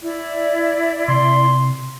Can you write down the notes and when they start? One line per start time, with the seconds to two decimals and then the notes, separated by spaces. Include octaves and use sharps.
0.03 E4 D5
1.08 C3 C6